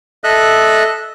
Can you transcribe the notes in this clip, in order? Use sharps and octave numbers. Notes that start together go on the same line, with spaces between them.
A4 D#5 E5 F#6